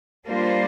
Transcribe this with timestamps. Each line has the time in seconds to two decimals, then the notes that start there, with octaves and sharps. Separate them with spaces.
0.27 G3 A#3 D4 F4 C5